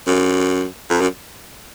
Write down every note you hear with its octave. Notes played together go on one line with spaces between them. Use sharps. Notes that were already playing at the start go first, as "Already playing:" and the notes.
F#2
F2
F#2